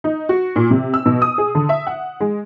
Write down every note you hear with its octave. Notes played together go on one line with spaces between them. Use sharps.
D#4
F#4
A#2
C3
E6
B2
D#6
G#4
D3
E5
F#5
G#3